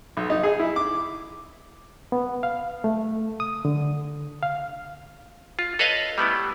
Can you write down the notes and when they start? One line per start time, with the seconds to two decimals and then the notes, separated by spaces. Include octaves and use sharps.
0.17 B1
0.30 D#4
0.43 G#4
0.59 E4
0.76 D6
2.12 B3
2.43 F5
2.84 A3
3.40 D#6
3.65 D3
4.43 F5
5.59 F4
5.79 A4 B4 C#5 D#5 F5
6.18 G3 A3 B3 E4